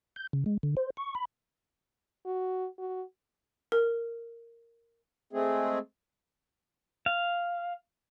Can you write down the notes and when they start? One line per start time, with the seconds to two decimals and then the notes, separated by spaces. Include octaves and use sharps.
0.16 G6
0.33 C#3
0.46 G#3
0.63 D3
0.77 C5
0.97 C#6
1.15 B5
2.26 F#4
2.78 F#4
3.72 A#4
5.33 G#3 A3 C4 G#4
7.06 F5